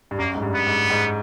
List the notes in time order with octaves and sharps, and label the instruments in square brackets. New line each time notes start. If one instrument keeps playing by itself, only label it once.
[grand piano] G2
[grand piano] F#2 [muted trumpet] A#3
[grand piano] G#2
G2
[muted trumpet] B3
[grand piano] G#2
G#2